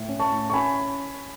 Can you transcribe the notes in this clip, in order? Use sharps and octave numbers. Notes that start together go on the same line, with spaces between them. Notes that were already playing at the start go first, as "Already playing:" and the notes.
Already playing: A2
C#4
A5 C#6
A2
C#6
C#4 G#5 B5